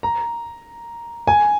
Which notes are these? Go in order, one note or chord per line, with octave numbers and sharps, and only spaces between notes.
A#5
G#5